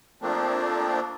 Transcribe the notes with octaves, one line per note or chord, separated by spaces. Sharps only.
F3 A3 A#3 C4 D4